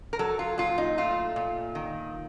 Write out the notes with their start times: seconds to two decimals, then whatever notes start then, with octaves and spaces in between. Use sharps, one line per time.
0.13 A#4
0.19 F#3 A4
0.39 F4
0.58 A#2 F4
0.78 D#4
0.98 A3 F4
1.36 A#2
1.75 D#3